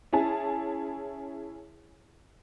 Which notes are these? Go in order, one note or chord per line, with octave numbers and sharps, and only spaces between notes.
C#4 E4 G#4 A5